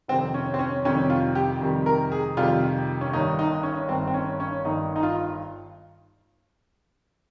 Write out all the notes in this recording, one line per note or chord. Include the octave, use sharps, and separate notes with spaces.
F2 C3 D#3 G3 C4
C#4
C4
C#4
F2 C3 D#3 G3 C#4
F4
G4
F2 C3 D#3 G3
A#4
G#4
F2 C3 D#3 G3 F4
C#4
G1 G2 D#3 D#4
D#4
C#4
G1 G2 D#3 C4
C4
C#4
C#4
G1 G2 D#3 D#4
D#4
F4